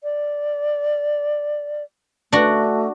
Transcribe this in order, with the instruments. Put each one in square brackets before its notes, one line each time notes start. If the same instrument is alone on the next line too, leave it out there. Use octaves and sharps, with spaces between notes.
[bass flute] D5
[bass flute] A3 [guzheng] D4 F#4